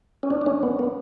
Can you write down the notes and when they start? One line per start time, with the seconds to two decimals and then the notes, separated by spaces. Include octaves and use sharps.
0.23 C#4
0.30 D4
0.41 D4
0.46 C#4
0.63 B3
0.79 B3